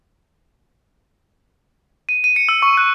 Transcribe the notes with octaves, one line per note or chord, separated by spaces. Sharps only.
D#7
D#7
C#7
E6
C#6
F#6